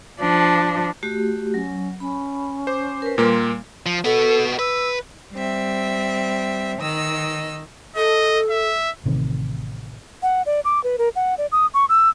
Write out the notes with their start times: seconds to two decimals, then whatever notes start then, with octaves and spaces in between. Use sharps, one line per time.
0.20 F3 D4
1.03 A3 F#4 G4
1.54 F#3 C#4
2.00 C#4 B5
2.67 C5 D6
3.02 A#4 B4
3.18 A#2 G3 A#3 A#4 C6
3.86 F3
4.05 B3 F#4 A4
4.59 B4 E6
5.33 G3 C4 E5
6.80 D#3 D#5 E6
7.96 A4 D#5
8.50 E5
9.06 A1 C3 D#3
10.22 F#5
10.46 D5
10.65 D6
10.83 B4
10.98 A#4
11.15 F#5
11.38 D5
11.52 D#6
11.74 C#6
11.89 E6